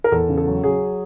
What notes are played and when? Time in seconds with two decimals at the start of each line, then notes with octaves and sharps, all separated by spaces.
0.04 A#4
0.12 E2 A4
0.29 C#3
0.38 A4
0.46 F#3
0.64 F#3 G#4